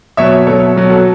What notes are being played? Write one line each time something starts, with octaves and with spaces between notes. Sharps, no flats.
B2 F#3 C#5 E5
B2 F#3 A4 C#5
B2 F#3
F#4 A4